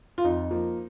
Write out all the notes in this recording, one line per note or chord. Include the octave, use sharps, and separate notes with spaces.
F4
F2 D#4
F3 A#3